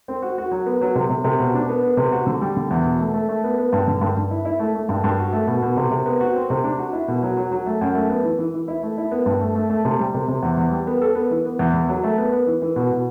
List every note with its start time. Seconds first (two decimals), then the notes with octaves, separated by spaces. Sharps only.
0.08 C4
0.22 F#4
0.38 F#4
0.51 F#3
0.66 B3
0.81 F#3
0.95 C3
1.10 C3
1.24 C3
1.39 B2
1.54 D4
1.69 B3
1.83 B3
1.97 C3
2.12 F#4
2.26 D3
2.41 G3
2.56 D3
2.71 E2
2.85 B2
2.99 A3
3.14 A3
3.29 A3
3.44 B3
3.58 B3
3.73 G2
3.88 D3
4.01 G2
4.16 G2
4.30 E4
4.45 E4
4.59 A3
4.75 A3
4.89 G2
5.04 G2
5.19 F#4
5.33 A3
5.47 B2
5.62 B2
5.77 C3
5.91 C3
6.06 B3
6.20 F#4
6.35 C4
6.50 C3
6.64 D4
6.79 F#4
6.93 E4
7.08 B2
7.23 F#3
7.37 F#3
7.52 F#3
7.66 A3
7.81 F#2
7.95 A3
8.09 B3
8.24 E3
8.39 E3
8.54 E3
8.68 E4
8.83 A3
8.97 E4
9.11 B3
9.26 G2
9.41 A3
9.55 A3
9.70 A3
9.85 C3
9.99 G3
10.14 C3
10.28 C3
10.43 E2
10.58 E2
10.71 G3
10.87 B3
11.02 A4
11.15 B3
11.31 E3
11.45 B3
11.59 E2
11.74 E2
11.89 F#3
12.04 A3
12.18 B3
12.32 B3
12.47 E3
12.62 E3
12.76 B2
12.91 B2